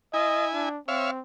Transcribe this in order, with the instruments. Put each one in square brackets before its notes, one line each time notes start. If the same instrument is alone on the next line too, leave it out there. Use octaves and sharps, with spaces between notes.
[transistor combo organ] E4 G#5 [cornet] D#5
[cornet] D4
[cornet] C4 [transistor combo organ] C#5 E5 F5